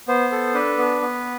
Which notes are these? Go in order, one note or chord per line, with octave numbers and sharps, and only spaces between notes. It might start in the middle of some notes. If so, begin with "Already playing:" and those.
B3 C5
A4
D4 B4
B3
B3